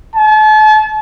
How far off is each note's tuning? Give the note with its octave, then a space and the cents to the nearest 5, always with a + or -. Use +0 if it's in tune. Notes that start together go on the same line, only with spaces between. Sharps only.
A5 -40